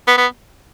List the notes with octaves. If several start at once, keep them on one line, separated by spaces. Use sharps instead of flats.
B3
B3